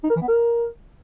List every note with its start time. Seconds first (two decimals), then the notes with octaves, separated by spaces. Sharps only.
0.04 D#4
0.10 A#4
0.16 E3
0.22 B3
0.28 A#4